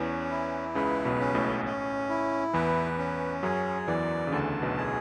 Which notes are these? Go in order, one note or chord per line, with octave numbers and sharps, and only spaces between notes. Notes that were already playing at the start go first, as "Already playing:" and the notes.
Already playing: E2 E3 C#4
E4
C#2 C#3 B4
B1 B2
C#4
A1 A2
C#4
E4
E2 E3 B4
C#4
F#2 F#3 G#4
E2 E3 D5
C#3
D2 D3 A5
B1 B2
G#4